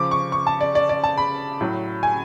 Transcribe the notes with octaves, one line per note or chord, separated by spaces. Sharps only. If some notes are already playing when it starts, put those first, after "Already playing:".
Already playing: C#3 F3 D6
C#6
C#6
A5
D5
D5
D5
A5
B5
A2 F#3
G#5